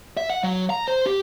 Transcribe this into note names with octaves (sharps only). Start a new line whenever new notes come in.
E5
F#5
F#3
A#5
C5
G4